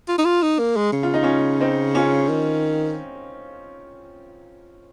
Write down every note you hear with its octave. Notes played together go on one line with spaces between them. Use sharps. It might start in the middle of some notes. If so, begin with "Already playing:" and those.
F4
D#4
F4
D#4
A#3
G#3
C#3
F4
D#4
C#4 F4
C4 D#4
C#4 F4
D#3